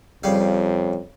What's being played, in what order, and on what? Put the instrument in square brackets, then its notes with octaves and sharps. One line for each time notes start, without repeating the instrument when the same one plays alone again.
[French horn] F2 [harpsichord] C#3 G3 F5